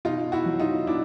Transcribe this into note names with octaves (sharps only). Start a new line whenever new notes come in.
B2 D#4 F4
E4 F#4
F#3
D#4 F4
B2 D4 E4